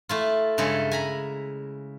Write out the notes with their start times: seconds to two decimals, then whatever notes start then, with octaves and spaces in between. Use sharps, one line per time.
0.09 A3 E4 F4
0.58 G2 C#3 G#3 E4 A4
0.91 G#5 A#5 B5